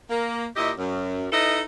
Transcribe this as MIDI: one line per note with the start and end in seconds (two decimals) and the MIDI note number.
0.10 0.44 58
0.56 0.72 46
0.56 0.72 64
0.56 0.72 67
0.56 0.72 75
0.77 1.26 42
1.32 1.61 63
1.32 1.61 64
1.32 1.61 69
1.32 1.61 71
1.32 1.61 75